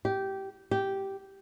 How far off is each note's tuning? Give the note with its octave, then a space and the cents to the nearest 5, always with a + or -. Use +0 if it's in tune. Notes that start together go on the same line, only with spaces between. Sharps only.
G4 -15
G4 -10